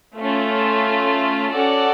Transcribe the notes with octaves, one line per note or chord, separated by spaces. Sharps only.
A3 C#4 F4
C#4 F#4 A4 D5 F#5